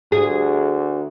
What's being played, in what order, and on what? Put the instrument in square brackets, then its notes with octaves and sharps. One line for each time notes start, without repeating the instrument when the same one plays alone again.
[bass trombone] D2 [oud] G#4